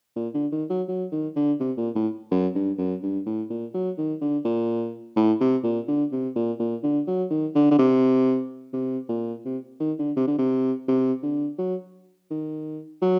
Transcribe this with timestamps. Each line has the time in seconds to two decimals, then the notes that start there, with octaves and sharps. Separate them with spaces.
0.16 A#2
0.34 D3
0.52 D#3
0.70 F#3
0.88 F#3
1.12 D#3
1.36 D3
1.60 C3
1.77 A#2
1.95 A2
2.31 F#2
2.55 G2
2.78 F#2
3.03 G2
3.26 A2
3.50 A#2
3.74 F#3
3.98 D#3
4.21 D3
4.45 A#2
5.16 A2
5.40 C3
5.63 A#2
5.88 D3
6.12 C3
6.36 A#2
6.59 A#2
6.83 D3
7.07 F#3
7.30 D#3
7.55 D3
7.71 D3
7.78 C3
8.73 C3
9.09 A#2
9.45 C3
9.80 D#3
9.99 D3
10.16 C3
10.27 D3
10.39 C3
10.88 C3
11.23 D3
11.58 F#3
12.31 D#3
13.02 F#3